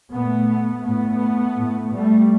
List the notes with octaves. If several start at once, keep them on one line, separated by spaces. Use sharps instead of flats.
A#2 A3 B3
A2 A3 B3
A2
G3 A3